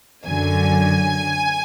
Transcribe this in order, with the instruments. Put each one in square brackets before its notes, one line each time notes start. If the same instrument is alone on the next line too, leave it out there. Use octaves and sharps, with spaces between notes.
[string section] F#2 D3 F#3 G#5